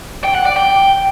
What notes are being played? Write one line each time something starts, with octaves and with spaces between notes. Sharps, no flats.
G5
F#5
D5
G5